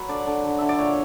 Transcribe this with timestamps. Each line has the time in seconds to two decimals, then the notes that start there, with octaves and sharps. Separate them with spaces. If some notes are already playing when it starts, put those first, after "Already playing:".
Already playing: F#3 B4
0.08 D3 D5
0.27 D3
0.44 D3
0.58 D3 E5
0.69 D5
0.78 A#2 C#5